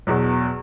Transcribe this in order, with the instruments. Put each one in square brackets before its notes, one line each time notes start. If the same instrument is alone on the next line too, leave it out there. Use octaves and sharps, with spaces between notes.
[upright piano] E2 B2 F#3